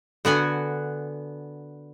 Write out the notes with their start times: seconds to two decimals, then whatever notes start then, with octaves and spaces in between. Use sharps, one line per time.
0.25 D3 B3 F#4 G#5